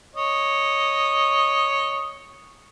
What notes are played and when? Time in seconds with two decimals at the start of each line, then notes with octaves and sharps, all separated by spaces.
0.15 C#5 D#5